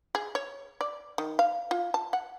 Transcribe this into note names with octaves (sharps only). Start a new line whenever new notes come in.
G#4
C#5
D5
D#3
F5
F4
A5
F#5